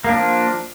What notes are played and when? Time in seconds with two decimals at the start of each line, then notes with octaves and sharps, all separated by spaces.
0.04 A#3
0.09 D4
0.13 F3